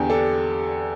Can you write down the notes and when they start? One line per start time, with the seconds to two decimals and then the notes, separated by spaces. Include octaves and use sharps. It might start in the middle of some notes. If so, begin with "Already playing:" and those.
Already playing: E2 D3 G4 G5
0.10 D4 A4